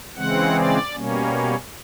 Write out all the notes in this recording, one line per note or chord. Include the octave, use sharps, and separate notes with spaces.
C#3 E3 G#3 C4 F#5
D5
B2 G3 A#3 C#4